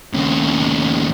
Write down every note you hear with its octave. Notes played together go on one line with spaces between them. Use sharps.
D#2 C#3